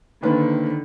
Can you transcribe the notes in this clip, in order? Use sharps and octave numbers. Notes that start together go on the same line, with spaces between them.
D3 D#3 A#3 C4 B4 B5